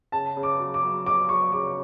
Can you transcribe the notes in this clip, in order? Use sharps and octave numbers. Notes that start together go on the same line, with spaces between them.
C#3 A5
C#3
D6
F#3
D6
F#3
F#3 D6
F#3 C#6
C#3 D6